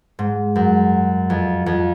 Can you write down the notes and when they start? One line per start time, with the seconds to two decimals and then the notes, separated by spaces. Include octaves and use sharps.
0.19 G#2
0.56 F#2
1.30 F2
1.66 F2